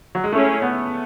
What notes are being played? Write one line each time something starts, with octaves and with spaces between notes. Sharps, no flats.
F#3
G#3
A3 C#4 E4 G#4 C#5
B3